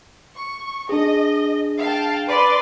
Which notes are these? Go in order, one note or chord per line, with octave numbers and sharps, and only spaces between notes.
C#6
D4 G#4 D#5
F5 G5 A5
B4 D5 C6